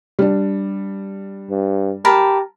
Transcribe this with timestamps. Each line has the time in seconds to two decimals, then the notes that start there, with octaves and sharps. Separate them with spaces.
0.19 G3 D4
1.51 G2
2.05 G4 A#4 A5 B5